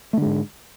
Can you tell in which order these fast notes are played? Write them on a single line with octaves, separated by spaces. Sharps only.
A3 D3 G#3 G#2